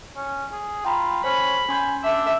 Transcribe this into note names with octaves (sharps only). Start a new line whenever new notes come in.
C#4
G#4
F4 G5 A#5 B5
C#4 C5 B5 C6
C#4 G#5 C6 G6
D4 E5